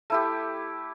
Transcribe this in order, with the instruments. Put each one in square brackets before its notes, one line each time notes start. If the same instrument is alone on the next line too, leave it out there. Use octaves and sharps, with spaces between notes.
[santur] A3 E4 G4